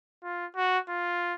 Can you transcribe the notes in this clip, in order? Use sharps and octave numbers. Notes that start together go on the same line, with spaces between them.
F4
F#4
F4